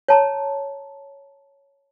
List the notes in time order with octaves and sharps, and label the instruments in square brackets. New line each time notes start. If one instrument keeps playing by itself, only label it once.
[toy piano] C#5 A5 A#5